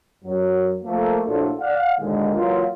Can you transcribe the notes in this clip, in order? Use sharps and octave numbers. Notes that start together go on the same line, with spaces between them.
F#2 F#3
F3 A3 A#3
A#1 A2 D4 F4 F#4 A4
D5 F5 F#5
D#2 A#2 D3 D#3 G#3
E3 F#3 A#3 F4